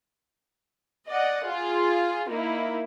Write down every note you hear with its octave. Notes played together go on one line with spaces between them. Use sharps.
D5 D#5 F#5
F4 G#4
A#3 D#4 E4